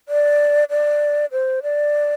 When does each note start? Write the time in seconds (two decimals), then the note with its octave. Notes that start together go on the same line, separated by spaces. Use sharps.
0.09 D5
0.70 D5
1.32 C5
1.63 D5